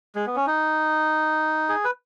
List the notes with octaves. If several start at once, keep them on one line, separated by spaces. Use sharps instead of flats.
G#3
B3
C#4
D#4
G#4
B4